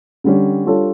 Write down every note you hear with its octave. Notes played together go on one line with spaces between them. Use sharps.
D3 G3 C#4
G3 D4 F4 A4 C#5